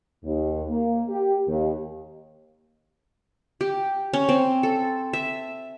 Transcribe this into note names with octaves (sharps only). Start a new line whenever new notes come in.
D#2
A#3
G4
D#2
G4
C#4
C4
A4
E5